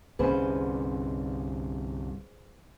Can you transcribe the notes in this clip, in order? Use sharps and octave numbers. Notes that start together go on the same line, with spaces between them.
G1 C2 C#4 G#4 B4 C5